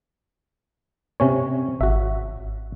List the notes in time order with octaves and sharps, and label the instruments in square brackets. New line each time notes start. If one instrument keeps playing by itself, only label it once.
[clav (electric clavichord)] C3 C#4 C#5
[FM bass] G#1 [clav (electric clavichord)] F#4 E5